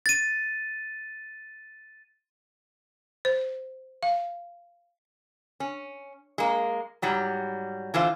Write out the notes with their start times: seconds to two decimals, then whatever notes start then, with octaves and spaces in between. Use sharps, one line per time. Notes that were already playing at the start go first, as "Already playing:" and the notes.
0.06 A6 D#7
3.25 C5
4.03 F5
5.60 C#4
6.38 G#3 A#3
7.02 G#2 F#3 G3
7.94 D3 E3 F4 C5